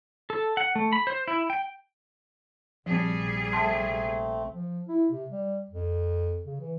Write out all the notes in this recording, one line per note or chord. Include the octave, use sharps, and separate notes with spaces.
A4
F#5
A3
B5
C5
E4
G5
A#1 C3 F3 G3 C4 G#4
A3 C4 A5 C6
F3
E4
C3
G3
F2
C#3
E3